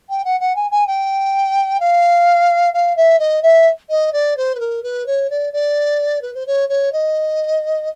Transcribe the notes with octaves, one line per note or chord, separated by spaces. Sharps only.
G5
F#5
F#5
G#5
G#5
G5
F5
F5
E5
D#5
E5
D#5
D5
C5
B4
A#4
B4
C#5
D5
D5
B4
C5
C#5
C#5
D#5